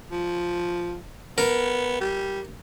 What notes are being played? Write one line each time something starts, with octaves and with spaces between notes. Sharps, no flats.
F3
B3 A#4
G3